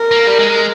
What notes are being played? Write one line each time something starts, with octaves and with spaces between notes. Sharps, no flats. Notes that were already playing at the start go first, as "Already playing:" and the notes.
Already playing: A#4
A#3
G3
G#3